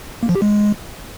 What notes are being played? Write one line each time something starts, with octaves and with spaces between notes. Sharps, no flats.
A#3
F3
G4
G#3